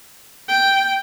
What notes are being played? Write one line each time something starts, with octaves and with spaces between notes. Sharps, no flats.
G5